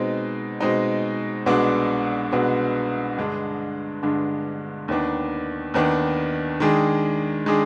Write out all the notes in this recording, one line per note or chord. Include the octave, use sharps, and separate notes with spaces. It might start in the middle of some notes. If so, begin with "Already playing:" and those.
Already playing: B2 G#3 C4 D#4
B2 G#3 C4 D#4
C2 B2 G#3 B3 D4
C2 B2 G#3 B3 D4
G2 D3 G#3 D4
G2 D3 G#3 D4
D#2 D#3 B3 D4
D#2 D#3 B3 D4
D#3 G#3 D4 G#4
D#3 G#3 D4 G#4